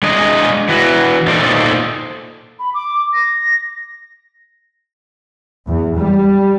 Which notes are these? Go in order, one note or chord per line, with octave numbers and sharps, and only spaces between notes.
G#3 D4 G#4 D#5
E3 F#4
A#2 D#4 A4 C5 D5
B5
D6
A#6
E2
G3